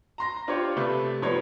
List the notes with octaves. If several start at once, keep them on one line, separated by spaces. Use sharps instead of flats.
A#5 C6 A#6
D4 F4 G4 C5 C#5
C3 A3 B4
F3 G3 B3 D#4 B4 C#5